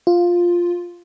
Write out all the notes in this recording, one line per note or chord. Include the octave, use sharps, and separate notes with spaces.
F4